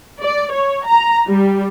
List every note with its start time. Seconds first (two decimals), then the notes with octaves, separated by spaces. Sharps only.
0.21 D5
0.52 C#5
0.85 A#5
1.27 G3